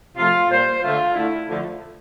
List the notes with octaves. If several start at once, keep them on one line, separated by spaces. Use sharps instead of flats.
C3 F3 A3 F4
A#2 G3 A#3 C5
D3 A3 F4
D3 A3 E4
D3 F3 A3